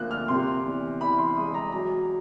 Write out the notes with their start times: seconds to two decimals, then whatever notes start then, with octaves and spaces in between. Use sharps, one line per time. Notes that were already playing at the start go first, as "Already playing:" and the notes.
Already playing: D2 D3 F3 A#3 F#6
0.11 F6
0.28 C3 C6
0.64 E2
1.01 E3 B5
1.18 C6
1.37 G#3 D#6
1.54 A#5
1.72 F#3 A#5